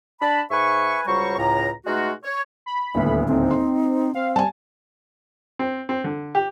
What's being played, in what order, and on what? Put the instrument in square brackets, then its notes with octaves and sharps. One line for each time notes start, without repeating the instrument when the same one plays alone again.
[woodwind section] D4 A5 B5
G#2 B4 E5 G#5 C#6
C#2 F#3 G3 C5 A#5 C#6
C#2 A2 A#5
B2 G#3 A3 D#4 F4 F#4
C#5
[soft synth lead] B5
[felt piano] D#1 D2 A2 [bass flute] B3
[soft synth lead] C4 [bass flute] D#4
[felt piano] C6
[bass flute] C4 [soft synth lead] F5
[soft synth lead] G3 [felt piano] G#5 A5
[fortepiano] C4
C4
D3
G4